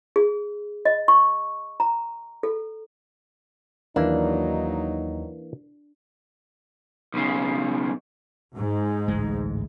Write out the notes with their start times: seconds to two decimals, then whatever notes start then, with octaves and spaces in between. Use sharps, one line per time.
0.16 G#4
0.85 D#5
1.08 C#6
1.80 A#5
2.43 A4
3.96 D#2 E3 F#3 A#3 D4 D#4
7.14 B1 C#3
8.57 G#2
9.08 A1 D2 G#3